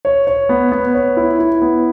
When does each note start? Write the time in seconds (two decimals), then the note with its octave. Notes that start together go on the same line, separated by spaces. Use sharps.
0.05 C#5
0.27 C#5
0.49 B3
0.72 B3
0.95 C#5
1.17 E4
1.39 E4
1.62 B3